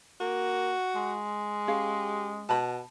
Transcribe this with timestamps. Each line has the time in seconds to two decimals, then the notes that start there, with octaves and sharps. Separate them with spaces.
0.20 A#3 F#4
0.95 G#3
1.68 C#4 G4 G#4 F5
2.49 B2 A5 B5